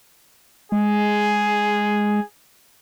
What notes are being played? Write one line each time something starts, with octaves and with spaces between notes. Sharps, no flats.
G#3 G#4